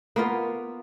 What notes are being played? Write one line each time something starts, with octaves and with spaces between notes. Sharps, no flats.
A#3 B3 F4